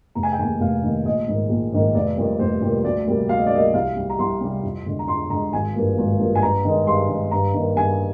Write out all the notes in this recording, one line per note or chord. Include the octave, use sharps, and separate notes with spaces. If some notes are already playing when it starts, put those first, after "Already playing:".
F1 A#5
G#5
G5
D#2 D#3 G#5
F1 F5
D#2 D#3
A#1 D#5
G#2 D#3 A#3
A#1
G#2 D#3 A#3
F1 D5
F2 C3 G3 A#3
F1 C5
F2 C3 G3 A#3
D2 D5
C3 G3 A#3
D2 F5
D#5
D5
C3 G3 A#3 D#5
C2 F5
C3 G3
A#5
C2 C6
C3 G3
F2
D3 G#3
A#5
F2 C6
D3 G#3 A#5
G#1 G#5
G2 F3 A#3
G#1
G2 F3 A#3
G#5
G2 A#5
D#3 G#3
G2 C6
D#3 G#3
G2 A#5
D#3 G3 A#3
G2 G#5